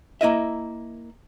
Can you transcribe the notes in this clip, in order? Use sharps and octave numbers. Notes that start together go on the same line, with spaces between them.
A#3 E4 D#5 E5